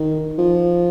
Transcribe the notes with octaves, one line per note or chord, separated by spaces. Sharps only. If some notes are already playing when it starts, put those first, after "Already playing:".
Already playing: D#3
F3